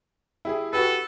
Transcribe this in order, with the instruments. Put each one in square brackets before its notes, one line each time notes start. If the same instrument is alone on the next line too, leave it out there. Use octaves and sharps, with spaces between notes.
[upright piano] E4 G4 G#4
[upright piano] F#4 G4 B4 [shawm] A4